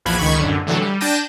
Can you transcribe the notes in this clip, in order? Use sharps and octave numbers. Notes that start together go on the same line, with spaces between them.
A#1 E2 F3 B5 F#6 G#6
C#2 D#3 B5 C#6 G#6
A1 F#2 D3
A2 D3 E3 F#3 A3
G3
D4 G5 A5 G6 A#6 D#7